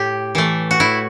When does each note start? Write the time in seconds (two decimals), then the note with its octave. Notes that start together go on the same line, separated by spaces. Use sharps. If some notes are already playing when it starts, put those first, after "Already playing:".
Already playing: A2 G4
0.35 E3 A3
0.71 F#4
0.80 A2 E4